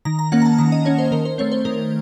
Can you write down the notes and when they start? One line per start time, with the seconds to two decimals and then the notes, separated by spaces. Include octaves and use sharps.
0.05 D#3 A#5
0.19 A#5
0.32 A#3 C#4 F#5
0.42 A#5
0.45 A5
0.58 D#3 A#5
0.72 D#5
0.85 A#3 C#4 C#5
0.98 C5
1.11 D#3 A#4
1.25 C5
1.38 A3 C4 C#5
1.52 C5
1.65 D#3 A#4